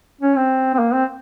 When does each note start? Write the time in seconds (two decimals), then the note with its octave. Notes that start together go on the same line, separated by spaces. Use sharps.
0.21 C#4
0.35 C4
0.74 C4
0.79 A#3
0.94 C4